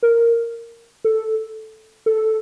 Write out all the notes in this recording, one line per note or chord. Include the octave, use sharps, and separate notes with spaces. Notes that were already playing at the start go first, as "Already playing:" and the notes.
A#4
A4
A4